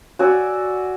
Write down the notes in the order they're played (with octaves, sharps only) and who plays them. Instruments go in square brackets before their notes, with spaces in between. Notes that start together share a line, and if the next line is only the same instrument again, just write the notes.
[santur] F#4 D5 G#5 E6